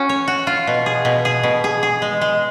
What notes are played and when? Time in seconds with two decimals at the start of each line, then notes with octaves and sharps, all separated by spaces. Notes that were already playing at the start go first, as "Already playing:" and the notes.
Already playing: C#4 F#4
0.09 C#5
0.28 F#4
0.47 F4
0.67 B2
0.86 G#4
1.05 B2
1.25 G#4
1.43 B2
1.64 G#4
1.83 G#4
2.02 G#3
2.21 G#3